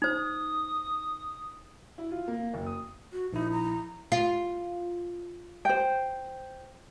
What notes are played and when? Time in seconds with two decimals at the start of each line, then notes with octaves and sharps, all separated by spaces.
0.02 D#4 C5 D#6
1.98 E4
2.11 F4
2.28 A#3
2.54 F#1
2.66 D#6
3.13 F#4
3.33 A#1 D#4 E4
3.52 A#5
4.12 F4
5.65 C5 G5